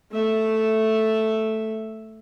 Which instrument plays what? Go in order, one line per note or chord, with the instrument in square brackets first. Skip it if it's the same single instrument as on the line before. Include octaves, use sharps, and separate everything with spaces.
[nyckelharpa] A3 E5